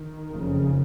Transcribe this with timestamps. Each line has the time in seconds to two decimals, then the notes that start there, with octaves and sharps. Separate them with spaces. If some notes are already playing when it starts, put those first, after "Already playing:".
Already playing: D#3
0.30 F#1 F2 C#3